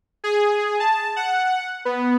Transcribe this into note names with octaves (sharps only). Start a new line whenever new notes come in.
G#4
A5
F#5
B3